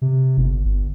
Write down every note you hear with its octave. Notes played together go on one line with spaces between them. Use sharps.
C3
G1
G1